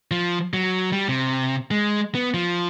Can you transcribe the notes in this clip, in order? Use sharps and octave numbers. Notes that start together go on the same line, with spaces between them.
F3
F#3
G3
C3
G#3
B3
F3